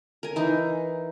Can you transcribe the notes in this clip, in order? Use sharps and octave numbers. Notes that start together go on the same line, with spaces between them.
A#4 G#5
E3 D#4